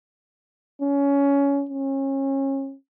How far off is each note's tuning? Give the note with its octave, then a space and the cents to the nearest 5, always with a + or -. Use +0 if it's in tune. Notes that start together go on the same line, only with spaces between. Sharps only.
C#4 +20
C#4 -30